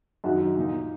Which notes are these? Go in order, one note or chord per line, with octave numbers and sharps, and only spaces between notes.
F#2 D#3 F#3 D#4 F#4
A#2 A#3 D#4